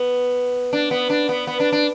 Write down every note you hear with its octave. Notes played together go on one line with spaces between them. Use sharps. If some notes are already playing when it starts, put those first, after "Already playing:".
Already playing: B3
D4
B3
D4
B3
B3
D4
D4